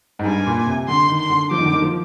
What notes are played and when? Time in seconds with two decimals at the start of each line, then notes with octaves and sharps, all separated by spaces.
0.19 G#2
0.25 G2 G#5
0.46 A#2
0.67 C3
0.88 D3 C6
1.09 D#3
1.19 C6
1.30 D3
1.51 F3 D6
1.58 D#3
1.66 D3
1.73 D#3
1.82 F3